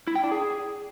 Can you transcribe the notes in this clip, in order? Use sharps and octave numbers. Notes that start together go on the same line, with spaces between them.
E4
G5
D4
G#4